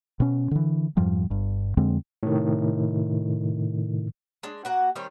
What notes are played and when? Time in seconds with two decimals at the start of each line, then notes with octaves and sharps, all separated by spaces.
0.20 B2 C#4
0.51 D3 E3
0.97 F2 G#2 F3 G3
1.30 G1 G2
1.77 F2 D3 G#3 C4
2.23 A2 C3 D#3
4.43 G#3 D4
4.65 A#3 F#4 F#5
4.95 D#3 G3 C4 C#4